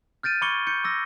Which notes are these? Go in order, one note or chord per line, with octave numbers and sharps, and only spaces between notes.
F6 G6 A6 D7 D#7
B5 C#6 D6 G#6 C#7 G7
G6 C#7
D6 E6 A#6